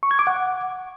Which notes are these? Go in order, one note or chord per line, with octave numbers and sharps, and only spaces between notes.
C#6
G#6
D6
F#5